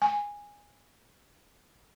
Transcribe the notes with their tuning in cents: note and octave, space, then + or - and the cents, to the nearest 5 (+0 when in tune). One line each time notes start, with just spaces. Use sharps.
G#5 -10